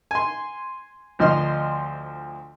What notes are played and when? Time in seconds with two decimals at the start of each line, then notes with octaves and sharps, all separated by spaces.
0.11 G#5 C6
1.19 D2 F3 D#5 C6 F6